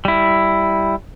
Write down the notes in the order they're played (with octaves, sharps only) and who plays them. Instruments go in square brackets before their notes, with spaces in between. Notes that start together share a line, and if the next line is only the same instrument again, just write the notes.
[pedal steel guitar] G3 E4